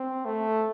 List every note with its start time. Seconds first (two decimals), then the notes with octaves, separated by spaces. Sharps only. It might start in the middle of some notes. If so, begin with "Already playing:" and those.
Already playing: C4
0.25 A3